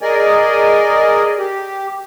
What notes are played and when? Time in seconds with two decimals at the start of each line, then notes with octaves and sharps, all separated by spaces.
0.01 G#4 A#4 D5 D#5 G#5
1.38 G4